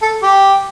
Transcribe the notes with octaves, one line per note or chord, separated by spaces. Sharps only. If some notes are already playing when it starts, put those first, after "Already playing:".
A4
G4